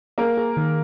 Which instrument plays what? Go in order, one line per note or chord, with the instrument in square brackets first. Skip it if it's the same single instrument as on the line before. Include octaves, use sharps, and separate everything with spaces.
[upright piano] A#3 A#4 [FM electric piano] G#4
[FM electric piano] G#4
D#3